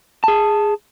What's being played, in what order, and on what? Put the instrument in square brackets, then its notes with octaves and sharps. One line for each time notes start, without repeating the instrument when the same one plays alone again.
[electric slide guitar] G#4 A5